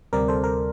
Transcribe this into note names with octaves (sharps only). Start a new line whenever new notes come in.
D2 C3 G3 C4 A#4 D5
A4 C5
A#4